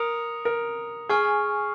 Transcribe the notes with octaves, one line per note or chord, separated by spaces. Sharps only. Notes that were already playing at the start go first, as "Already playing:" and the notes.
Already playing: A#4 D#6 C#7 F7
A#4
G#4 G#5 C#6 F6